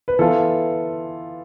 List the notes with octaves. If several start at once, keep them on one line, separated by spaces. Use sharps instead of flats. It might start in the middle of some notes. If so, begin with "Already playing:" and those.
B4
E3 B3 F4 A4